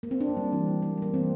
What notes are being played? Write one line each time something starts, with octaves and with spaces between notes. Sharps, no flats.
A#3
C4
A#3 D4
G3
E3
E3
A#3
G3 A#3
E3 C4